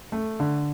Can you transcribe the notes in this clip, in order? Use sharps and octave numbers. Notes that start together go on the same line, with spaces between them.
A3
D3